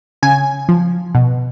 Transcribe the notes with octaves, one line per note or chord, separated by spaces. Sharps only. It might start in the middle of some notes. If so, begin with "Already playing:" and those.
C#3 G#5
F3
B2